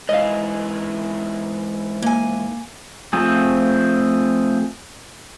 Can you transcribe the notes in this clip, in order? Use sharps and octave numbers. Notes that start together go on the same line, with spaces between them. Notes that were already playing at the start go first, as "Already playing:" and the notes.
G#2 E3 D#5 F5
A#3 G#5
F3 A3 C4 G#4